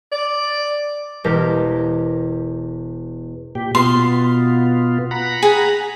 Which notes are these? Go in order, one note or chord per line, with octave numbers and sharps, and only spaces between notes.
D5
E1 G4 A#4 A5
A#2 G4
B2 B3 F4 C6
F#5 A#5 B5
G#4